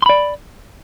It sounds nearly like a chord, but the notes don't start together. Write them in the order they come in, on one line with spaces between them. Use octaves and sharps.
C6 B5 D5